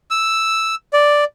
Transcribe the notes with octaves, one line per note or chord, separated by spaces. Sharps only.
E6
D5